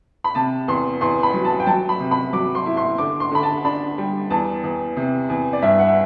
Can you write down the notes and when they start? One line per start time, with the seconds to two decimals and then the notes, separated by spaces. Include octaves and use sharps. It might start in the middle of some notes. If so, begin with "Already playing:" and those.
0.24 B5
0.35 C3 A5
0.68 E2 C6
1.01 E2 C6
1.23 B5
1.34 F#3
1.45 A5
1.60 G5
1.67 F#3 A5
1.89 B5
2.00 C3
2.11 B5
2.33 F#3 D6
2.55 C6
2.66 E4
2.77 C6
2.98 D3 D6
3.20 C6
3.31 D3 B5
3.43 A5
3.65 D4 B5
3.98 G3
4.30 E2 A5
4.64 E2
4.97 C3
5.29 E2
5.53 D5
5.62 G2 E5
5.79 F#5
5.88 E5